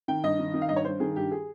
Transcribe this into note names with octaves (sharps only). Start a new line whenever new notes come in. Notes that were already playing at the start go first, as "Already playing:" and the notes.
D#3 G5
G2 D#5
D#3
D#3
F5
G2 D#5
C#5
G2 C5
D#3 G#4
G2 G4
G#4